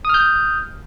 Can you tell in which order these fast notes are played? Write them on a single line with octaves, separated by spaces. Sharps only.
D#6 F6 G6